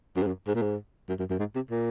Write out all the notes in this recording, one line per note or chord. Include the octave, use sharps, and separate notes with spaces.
F#2
G#2
F#2
G#2
A#2
G#2
F#2
F#2
F#2
G#2
C3
A#2